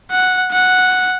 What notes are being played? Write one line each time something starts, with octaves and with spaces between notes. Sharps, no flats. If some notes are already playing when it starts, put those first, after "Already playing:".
F#5
F#5